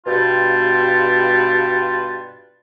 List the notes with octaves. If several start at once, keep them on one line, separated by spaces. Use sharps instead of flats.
G2 B2 B3 F4 G5 A5